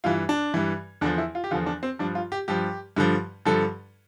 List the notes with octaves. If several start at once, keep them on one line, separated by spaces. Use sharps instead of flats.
G2 E3 F4
D4
G2 E3
E2 D3 F3 D4
E4
F4
G4
E2 D3 F3 F4
D4
C4
G2 F3 D4
F4
G4
G2 F3 G4
G2 D3 F3
G2 D3 F3 A4